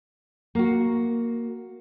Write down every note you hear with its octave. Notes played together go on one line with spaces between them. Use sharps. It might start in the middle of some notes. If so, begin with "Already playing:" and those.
A#3 F#4